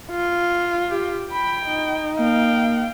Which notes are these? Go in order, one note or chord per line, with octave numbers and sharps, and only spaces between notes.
F4
G4
G5 B5
D#4
A#3 F5 G5